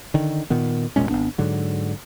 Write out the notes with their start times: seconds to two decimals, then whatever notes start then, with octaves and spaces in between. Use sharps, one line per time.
0.14 D3 D#3
0.50 A#2 D#3 B3
0.96 E1 A#2 G#3 C#4
1.09 G#1 A2 B3 D4
1.38 G#2 D3 F#3